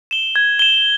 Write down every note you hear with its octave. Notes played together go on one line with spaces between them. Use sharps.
E7 G7
G#6
E7 G7